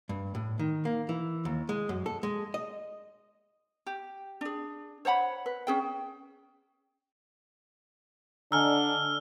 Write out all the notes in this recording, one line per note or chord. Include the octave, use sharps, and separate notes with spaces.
G2
A2
D#3
A#3
E3
D#2
G#3
F#2
A4
G#3
D#5
G4
D4 G#4
C5 C#5 F#5 B5
B4
C#4 G#4 G5
D3 D4 D#5 G#5 A#5 E6 F6